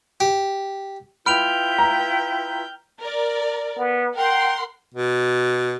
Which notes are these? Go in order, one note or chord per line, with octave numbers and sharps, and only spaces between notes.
G4
E4 F4 B4 G5 B5 F6 D7 F7
A#5
A#4 D5
B3
A#4 F#5 G5 C6
B2